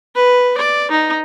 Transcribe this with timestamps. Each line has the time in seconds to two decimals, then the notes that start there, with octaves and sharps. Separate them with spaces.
0.16 B4
0.57 D5
0.91 D#4